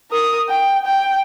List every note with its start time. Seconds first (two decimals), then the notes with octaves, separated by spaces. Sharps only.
0.11 A#4 D#6
0.49 G5
0.85 G5